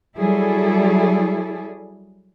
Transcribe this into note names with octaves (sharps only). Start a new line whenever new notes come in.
F#3 G3 E4 G#4 A4 D5